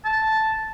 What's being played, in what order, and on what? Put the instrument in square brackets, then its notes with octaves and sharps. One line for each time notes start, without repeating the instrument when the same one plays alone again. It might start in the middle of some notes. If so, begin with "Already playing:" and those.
[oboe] A5